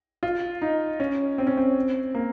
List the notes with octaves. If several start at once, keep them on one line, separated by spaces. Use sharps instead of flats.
F4
D#4
C#4
C4
C#4
C4
A#3